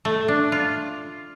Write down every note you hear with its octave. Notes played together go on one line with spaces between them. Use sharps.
A3
D4
F4